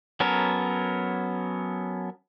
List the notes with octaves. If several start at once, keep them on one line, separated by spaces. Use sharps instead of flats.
F#3 B3 C#4 A4 A#4